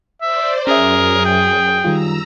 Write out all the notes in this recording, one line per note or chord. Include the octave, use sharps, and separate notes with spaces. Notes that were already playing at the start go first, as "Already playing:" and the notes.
C5 D5 E5
F#2 C#4 G#4 A#4 E5
G5
D#3 G3 F4 A#5 E6